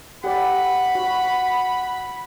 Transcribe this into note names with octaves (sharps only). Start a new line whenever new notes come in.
G4 A4 D5 F#5 B5
F#4